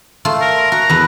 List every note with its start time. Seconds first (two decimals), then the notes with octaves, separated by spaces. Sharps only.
0.25 A3 F4
0.41 A#4
0.72 F#4 A#5
0.90 E2 B4